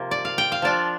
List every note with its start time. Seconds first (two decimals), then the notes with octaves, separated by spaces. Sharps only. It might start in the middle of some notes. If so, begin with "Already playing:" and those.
Already playing: C3 F3 A#3 F4
0.11 D5
0.25 F5
0.38 G5
0.52 F5
0.62 F3 D4 F4 D5